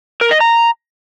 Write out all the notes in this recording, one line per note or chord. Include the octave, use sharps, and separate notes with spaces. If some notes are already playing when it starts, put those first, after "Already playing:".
A#4
D#5
A#5